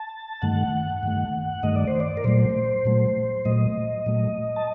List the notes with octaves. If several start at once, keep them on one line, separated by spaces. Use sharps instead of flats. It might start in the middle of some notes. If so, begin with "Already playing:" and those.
Already playing: A5
G2 D#3 A3 F#5
G2 D#3 A3
G2 D#3 A3 D#5
D5
C5
D5
A#4
A#2 F#3 A3 C5
A#2 F#3 A3
A#2 F#3 A3 D#5
A#2 F#3 A3
A5